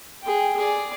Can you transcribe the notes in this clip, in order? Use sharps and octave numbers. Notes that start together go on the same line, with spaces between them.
G#4 G5
G#4 D5